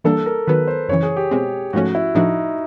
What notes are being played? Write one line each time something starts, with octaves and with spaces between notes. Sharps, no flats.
E3 G3 A#3 D4 A4
A#4
D#3 F#3 B3 B4
C5
F#2 C#3 E3 C#5
G#4
G4
B2 G#3 C4
G#2 F3 A3 C#4 F#4
E4
A2 F3 A3 D4 D#4 F#4